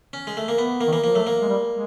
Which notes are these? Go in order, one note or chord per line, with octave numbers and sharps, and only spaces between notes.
C#4
G#3
A3
A#3
B3
A#3
D#3
E3 A#3
F3 A#3
F#3 A3
A#3
G#3
G3
G#3